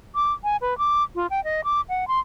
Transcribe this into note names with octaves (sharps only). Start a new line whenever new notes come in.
D6
G#5
B4
D6
F4
G5
D#5
D6
F#5
C6